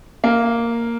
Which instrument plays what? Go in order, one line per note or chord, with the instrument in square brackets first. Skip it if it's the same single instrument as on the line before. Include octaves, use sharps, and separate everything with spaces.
[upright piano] A#3